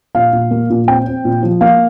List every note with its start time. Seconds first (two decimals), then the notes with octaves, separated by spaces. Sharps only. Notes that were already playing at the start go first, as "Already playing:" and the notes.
0.15 A#2 F5
0.33 A#2
0.51 A#3
0.70 A#2
0.87 C4 G5
1.06 C4
1.25 A#2
1.43 F3
1.61 A#3 F5